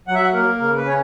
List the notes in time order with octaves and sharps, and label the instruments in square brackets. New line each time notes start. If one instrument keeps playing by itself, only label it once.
[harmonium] F#3 F#5
E5
F#5
A#3 A#4
C#3 A#4
B4
C#4 C#5